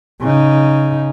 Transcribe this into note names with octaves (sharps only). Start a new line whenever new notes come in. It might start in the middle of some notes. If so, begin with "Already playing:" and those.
C#3 D#4